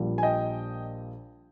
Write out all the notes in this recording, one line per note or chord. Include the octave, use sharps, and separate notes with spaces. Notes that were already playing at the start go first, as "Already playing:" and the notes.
Already playing: A#1 A#2 G3 A#3
G#5
D#5 G5